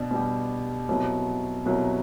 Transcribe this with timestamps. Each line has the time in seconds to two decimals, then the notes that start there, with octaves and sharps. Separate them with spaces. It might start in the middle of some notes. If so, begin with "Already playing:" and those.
Already playing: B2 D4
0.11 B2 G3 D4 G4
0.89 C2 B2 F#3
1.66 C2 B2 F#3